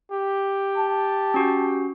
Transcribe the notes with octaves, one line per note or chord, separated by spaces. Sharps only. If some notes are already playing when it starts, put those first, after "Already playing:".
G4
A5
C#4 F#4